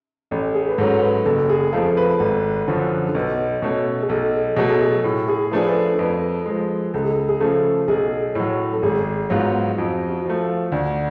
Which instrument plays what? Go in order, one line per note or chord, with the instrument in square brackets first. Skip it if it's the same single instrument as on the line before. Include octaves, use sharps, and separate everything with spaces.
[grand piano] A1 [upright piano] A4
[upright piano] G#4
B4
[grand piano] G#2 [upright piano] A4
[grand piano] F#3 C#4
[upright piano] B4
[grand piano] F#1 [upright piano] A4
[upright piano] G#4
[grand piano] F2 F3 A3 F4 [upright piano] A4
[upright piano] B4
[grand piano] G#1 [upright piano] A4
[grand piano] F#2 D3 F3
[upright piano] A4
[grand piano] B1 [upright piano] B4
[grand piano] B2 A3 C#4
[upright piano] G#4
[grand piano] B1 [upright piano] A4
[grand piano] B2 F#3 A3 [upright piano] G#4
[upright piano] A4
G#4
[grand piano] A2
[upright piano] G#4
[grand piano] F3 A3 D4 G#4 [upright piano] B4
[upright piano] B4
A4
A4
[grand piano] F2 [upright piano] B4
[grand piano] F3 G#3
[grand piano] C#2 [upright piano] A4
[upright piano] G#4
A4
G#4
[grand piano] C#3 F3 A3 [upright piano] A4
[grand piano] B1 [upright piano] G#4
[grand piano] A2 F#3
[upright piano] A4
[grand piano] G#1 [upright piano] G#4
[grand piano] G#2 F#3 B3 F4
[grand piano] F2 [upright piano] F#4
[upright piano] F#4
[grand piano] F3 A3
[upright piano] F4
[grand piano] D2 [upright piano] D4